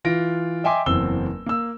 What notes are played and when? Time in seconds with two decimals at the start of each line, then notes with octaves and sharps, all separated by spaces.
0.04 E3 F4 A#6 D7
0.64 D#5 E5 G5 G#5 C6 D6
0.86 F#1 E2 C4 E6 G7
1.46 A#3 E6